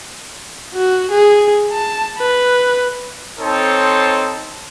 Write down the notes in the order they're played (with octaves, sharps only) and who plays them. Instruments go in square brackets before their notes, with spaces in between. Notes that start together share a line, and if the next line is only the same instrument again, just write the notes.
[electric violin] F#4
G#4
A5
B4
[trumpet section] C4 D#4 A4 C5 C#5 A5